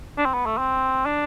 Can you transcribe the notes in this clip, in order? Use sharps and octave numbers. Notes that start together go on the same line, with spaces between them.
D4
C4
B3
A3
C4
D4